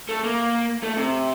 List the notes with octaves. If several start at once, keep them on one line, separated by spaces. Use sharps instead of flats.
A3
A#3
A3
C3